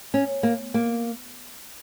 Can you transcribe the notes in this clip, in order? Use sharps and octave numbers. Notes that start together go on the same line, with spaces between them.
C#4
A#3
A#3